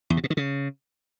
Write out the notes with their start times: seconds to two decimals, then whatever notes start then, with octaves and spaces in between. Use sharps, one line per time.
0.10 E2
0.17 C3
0.24 B2
0.30 D#3
0.37 C#3